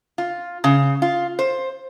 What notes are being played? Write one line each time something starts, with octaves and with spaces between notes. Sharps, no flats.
F4
C#3
F4
C5